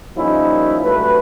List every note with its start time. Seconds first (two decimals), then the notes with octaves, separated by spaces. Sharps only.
0.17 F3 G3 A#3 C#4 D#4 E4
0.83 C2 G2 F#3 A3 B4